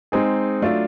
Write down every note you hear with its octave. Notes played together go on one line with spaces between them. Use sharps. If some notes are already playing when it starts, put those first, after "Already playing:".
G#3 C4 D#4 G#4
F#3 A3 D4 F4